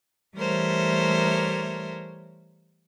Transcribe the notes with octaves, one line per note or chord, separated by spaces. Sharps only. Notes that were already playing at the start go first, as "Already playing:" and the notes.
E3 G3 A3 A#4 C5 C#5